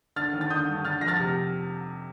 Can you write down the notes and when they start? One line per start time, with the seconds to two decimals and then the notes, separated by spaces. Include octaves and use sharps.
0.16 D3 F6 A6
0.33 D#2
0.41 A6
0.50 D3 D#6 G6
0.68 G2
0.85 D3 F6 A6
1.01 F2 A#6
1.08 F6 A6
1.19 C3